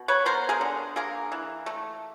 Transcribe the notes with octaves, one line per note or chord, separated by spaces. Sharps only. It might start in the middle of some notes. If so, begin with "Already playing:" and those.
Already playing: B2
B4 C#5
B3 A#4 C5
G#4 A#4
D3
A#3 G#4 A#4
E3
A3